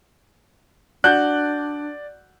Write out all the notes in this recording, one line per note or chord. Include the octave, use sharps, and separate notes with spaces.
D4 F#4 D5 A5 F#6 G6